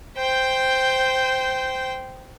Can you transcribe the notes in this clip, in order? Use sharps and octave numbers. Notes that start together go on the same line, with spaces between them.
C5 G5